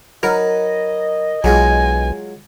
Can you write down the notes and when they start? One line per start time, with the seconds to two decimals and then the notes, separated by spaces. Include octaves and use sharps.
0.23 F#3 D#4 A#4 B4 D#5
1.44 B1 F#3 G#3 F4 G#5